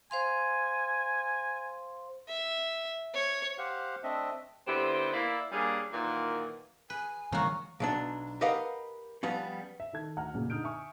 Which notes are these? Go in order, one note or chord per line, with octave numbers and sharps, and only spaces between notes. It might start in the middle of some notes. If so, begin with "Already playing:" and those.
C5 F5 G#5 C6
E5
C#5
G4 C5 F5 F#5
A3 C4 D4 D#5 E5
D3 B3 C4 E4 G4 C5
A#3 E4 D5
G3 A#3 C#4 D4 G#4
A#2 D#3 E3 F#3 A#3
B4 G#5
D#3 E3 G3 A3 F#4 A#4 C#5 F5
B1 F#3 D4
G4 A#4 B4 D#5 F5 F#5
F3 G3 B3 C#4
E5
D#3 A4 G#6
D2 F#5 A#5 F6
A1 F#2 A#2 C#3
D3 D#4 D#6 F6 G6 D7
E5 G#5 C#6 D#6